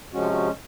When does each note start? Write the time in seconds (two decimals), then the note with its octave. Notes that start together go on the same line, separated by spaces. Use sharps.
0.14 C3 F3 G#3 C#4 F#4
0.33 F#4